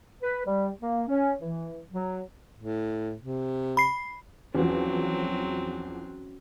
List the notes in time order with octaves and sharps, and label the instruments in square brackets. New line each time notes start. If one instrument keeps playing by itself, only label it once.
[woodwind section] B4
G3
A#3
C#4
E3
F#3
[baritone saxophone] A2
C3
[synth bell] B5 C7
[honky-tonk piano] E2 F3 [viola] F#3 C4 [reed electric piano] C#4 F#4